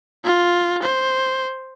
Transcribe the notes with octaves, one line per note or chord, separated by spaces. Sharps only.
F4
C5